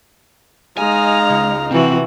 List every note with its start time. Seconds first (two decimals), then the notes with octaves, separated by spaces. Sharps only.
0.78 G#3 D#4 F5 G#5 A#5
1.30 C#2
1.71 C3 E3 C4 F#4